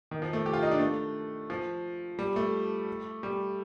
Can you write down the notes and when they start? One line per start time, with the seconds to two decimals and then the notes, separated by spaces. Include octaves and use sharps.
0.11 D#3
0.22 F3
0.33 A3
0.46 G4
0.53 F4
0.63 D#4
0.71 D4
0.79 A3
1.50 F3
2.19 G3
2.36 A3
3.23 G3